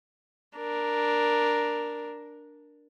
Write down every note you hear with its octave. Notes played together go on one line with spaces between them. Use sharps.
D4 A#4